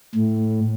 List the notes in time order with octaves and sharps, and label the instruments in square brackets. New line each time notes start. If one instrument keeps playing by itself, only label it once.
[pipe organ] A2